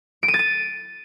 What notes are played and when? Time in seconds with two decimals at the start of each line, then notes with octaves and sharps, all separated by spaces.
0.23 D7
0.28 D#7
0.34 A6
0.39 D#7